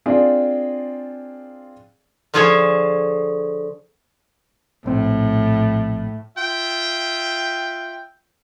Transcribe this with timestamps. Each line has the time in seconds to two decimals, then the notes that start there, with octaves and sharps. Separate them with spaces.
0.06 C4 D4 F4 G#4 D5
2.34 D3 F3 F4 G#4 A4 C#5
4.86 A#1 A2 C4
6.36 F4 E5 G5